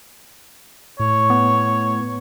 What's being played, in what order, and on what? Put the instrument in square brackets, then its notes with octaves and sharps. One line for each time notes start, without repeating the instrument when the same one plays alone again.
[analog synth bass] A2 [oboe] C#5
[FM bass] B3